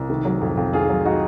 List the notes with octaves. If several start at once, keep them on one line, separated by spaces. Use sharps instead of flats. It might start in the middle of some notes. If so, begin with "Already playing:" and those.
Already playing: C2
D#3
F#3
F2
F2
D#3 F4 G#4
F#3
D#4 F#4